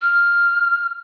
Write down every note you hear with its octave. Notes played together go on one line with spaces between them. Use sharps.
F6